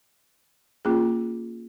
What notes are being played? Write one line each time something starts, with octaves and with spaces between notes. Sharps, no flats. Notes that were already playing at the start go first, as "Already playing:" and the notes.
A#3 C#4 F4 G#4